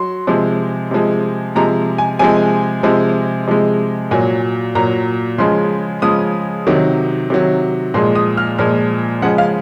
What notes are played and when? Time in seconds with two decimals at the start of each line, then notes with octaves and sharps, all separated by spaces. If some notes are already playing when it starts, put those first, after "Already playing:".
Already playing: F#3 C6
0.27 C3 F3 G#3
0.91 C3 F3 G#3
1.55 C3 F3 G#3 A#5
1.98 G#5
2.19 C3 F3 G#3 G#5
2.83 C3 F3 G#3
3.48 C3 F3 G#3
4.11 A#2 F#3 G#5
4.75 A#2 F#3 A#5
5.38 C#3 F3 G#3 C6
6.02 C#3 F3 G#3 D#6
6.67 C3 D#3 F#3
7.30 C3 D#3 F#3
7.94 A#2 F3 G#3 C6
8.15 D#6
8.37 F6
8.58 A#2 F3 G#3 F6
9.22 C#3 F3 G#3 F#5
9.38 F5